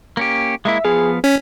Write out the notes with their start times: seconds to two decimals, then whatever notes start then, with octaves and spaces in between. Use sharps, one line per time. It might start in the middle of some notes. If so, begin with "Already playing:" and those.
0.17 A#3 C#4 G4
0.65 G#3 A#3 E4 E5
0.85 F3 B3 G#4 F5
1.24 C#4 B6